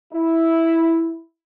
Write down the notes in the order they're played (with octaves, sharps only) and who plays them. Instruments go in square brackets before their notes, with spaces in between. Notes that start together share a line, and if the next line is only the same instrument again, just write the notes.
[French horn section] E4